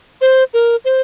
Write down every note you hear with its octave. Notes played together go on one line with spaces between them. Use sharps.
C5
A#4
C5